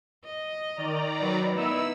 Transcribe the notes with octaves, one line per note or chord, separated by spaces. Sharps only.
D#5
D#3 D5 A#5
F#3 B4
B3 D#4 E4 E6